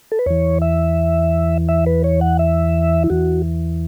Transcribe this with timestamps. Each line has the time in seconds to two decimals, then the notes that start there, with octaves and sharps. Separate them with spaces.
0.12 A4
0.19 B4
0.26 E2 E3 C#5
0.62 E5
1.69 E5
1.86 B4
2.04 C#5
2.21 F#5
2.39 E5
3.04 E4
3.10 E2 E3 F#4